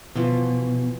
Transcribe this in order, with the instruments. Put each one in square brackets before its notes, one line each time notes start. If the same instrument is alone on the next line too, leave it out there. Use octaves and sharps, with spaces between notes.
[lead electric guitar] B2 [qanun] E3 F3